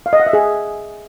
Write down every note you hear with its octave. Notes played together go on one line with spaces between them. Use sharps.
F5
D#5
F#5
E5
G#4